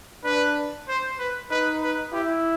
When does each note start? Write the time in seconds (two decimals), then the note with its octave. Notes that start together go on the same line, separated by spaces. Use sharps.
0.24 D4 B4
0.88 C5
1.19 B4
1.50 D#4 B4
1.82 B4
2.13 E4 G4